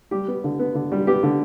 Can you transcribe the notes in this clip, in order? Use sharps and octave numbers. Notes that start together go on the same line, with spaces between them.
G3 G4
B3
D3
B3
D3
G3
B3 G4
D3